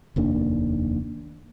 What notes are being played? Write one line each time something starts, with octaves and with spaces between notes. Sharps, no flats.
F1 D#2 A#3 D4